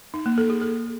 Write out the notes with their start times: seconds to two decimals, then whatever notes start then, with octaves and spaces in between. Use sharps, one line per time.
0.14 D#4
0.26 A#3
0.38 A4
0.50 G#4
0.62 A4